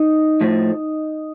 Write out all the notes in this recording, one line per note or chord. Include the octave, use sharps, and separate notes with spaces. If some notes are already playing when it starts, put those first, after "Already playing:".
Already playing: D#4 D#5
A2 F3 A3